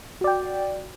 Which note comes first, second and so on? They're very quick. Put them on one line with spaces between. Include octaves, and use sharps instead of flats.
F#4 D5 G5